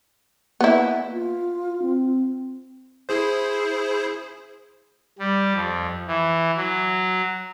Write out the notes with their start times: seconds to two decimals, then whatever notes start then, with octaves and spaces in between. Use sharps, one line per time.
0.61 A#3 B3 E4
1.13 F4
1.82 C4
3.09 E4 G#4 C5
5.19 G3
5.55 F2
6.07 E3
6.57 F#3